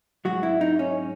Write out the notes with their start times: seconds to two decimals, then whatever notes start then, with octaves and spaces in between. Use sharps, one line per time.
0.25 G#2 F#3 F#4
0.43 E4
0.61 D#4
0.79 C#4